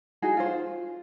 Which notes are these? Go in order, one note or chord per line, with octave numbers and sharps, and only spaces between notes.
D#4 F#4 G#4
F4 C5